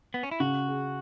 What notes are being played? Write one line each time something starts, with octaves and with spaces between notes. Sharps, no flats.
B3
C#4
E4
C#3 F#4
G#4